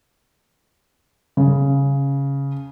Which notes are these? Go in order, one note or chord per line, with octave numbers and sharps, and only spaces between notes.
C#3